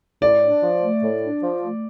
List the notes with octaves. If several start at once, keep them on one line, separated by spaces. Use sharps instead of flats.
A2 D5
D4
F3
A3
A2
D4
F3
A3